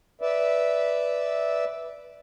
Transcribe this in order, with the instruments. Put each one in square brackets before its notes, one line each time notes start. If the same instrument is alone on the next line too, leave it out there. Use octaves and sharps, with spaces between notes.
[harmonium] B4 D5 E5